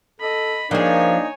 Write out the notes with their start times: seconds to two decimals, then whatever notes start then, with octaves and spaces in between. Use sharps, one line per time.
0.20 A4 D#5 B5
0.71 F3 A#3 D4 D#4 G#4 A#4 C#5 G#5